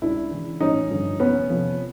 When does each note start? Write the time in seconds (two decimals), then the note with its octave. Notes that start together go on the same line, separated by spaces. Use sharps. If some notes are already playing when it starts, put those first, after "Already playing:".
0.02 C#2 D4 E4
0.31 C#3 E3
0.61 A1 C#4 D#4
0.90 G2 D3 F3
1.20 F1 B3 C#4
1.49 F2 C3 F3